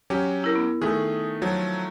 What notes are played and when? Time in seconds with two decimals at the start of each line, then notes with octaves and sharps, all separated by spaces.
0.10 F#3 C#4 G4
0.44 E4 A#4
0.56 B3
0.82 D#3 A3 G#4
1.42 F3 F#3